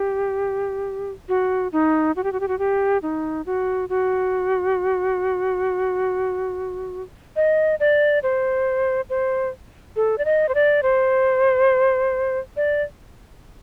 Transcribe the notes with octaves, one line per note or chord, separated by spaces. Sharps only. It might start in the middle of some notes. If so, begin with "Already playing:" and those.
Already playing: G4
F#4
D#4
F#4
G4
F#4
G4
F#4
G4
D#4
F#4
F#4
D#5
D5
C5
C5
A4
D5
D#5
C5
D5
C5
D5